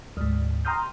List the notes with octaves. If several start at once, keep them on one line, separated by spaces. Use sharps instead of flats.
D2 G#2
G5 A#5 C6 D#6 F6 G6